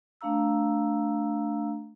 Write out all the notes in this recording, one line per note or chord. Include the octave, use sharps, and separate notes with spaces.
A3 D4 F5 A#5 E6